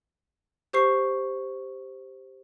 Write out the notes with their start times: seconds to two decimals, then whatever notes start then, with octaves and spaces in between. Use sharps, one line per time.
0.73 G4 C5 C#6 C7